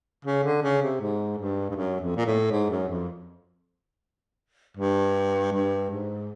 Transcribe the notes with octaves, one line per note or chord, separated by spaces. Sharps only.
C#3
D3
C#3
C3
G#2
G2
G2
F#2
F2
A#2
A2
G#2
F#2
F2
G2
G2
G#2